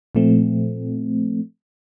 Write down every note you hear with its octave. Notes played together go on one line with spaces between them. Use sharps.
A#2 F3 A3 C4